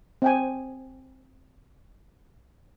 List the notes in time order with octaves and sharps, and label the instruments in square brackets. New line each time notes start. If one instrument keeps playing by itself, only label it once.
[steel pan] C4 G5 G#5